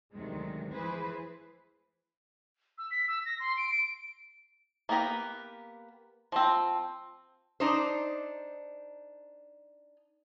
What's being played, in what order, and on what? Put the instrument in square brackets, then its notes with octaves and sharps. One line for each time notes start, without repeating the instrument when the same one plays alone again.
[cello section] D2 C3 D#3 F#3 G#3
E3 F3 E4 G#4 B4 C5
[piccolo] E6
B6
E6
A#6
C6
D7
D7
[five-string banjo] A#3 B3 G4 A#4 B4
F3 C4
[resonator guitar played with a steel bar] D4 D#4 C5